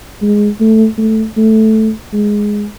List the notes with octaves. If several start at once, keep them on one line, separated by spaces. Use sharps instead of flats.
G#3
A3
A3
A3
G#3